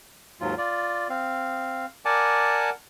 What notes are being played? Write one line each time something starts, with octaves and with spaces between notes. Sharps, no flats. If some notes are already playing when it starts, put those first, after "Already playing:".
D#2 G#2 F#3 F4
F4 D5
C4 F5
A#4 D5 F#5 G#5 A5 D6